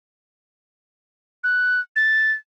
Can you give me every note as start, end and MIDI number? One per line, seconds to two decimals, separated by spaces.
1.44 1.80 90
1.96 2.32 93